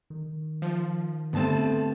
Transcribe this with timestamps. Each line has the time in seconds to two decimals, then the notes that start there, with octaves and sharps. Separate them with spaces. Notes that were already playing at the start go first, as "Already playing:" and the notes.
0.10 D#3
0.62 F3
1.33 G2 D3 A3 B3 C4 A5 E7